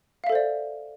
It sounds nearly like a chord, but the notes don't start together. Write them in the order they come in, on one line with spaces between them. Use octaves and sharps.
F5 E5 A4 C5 D5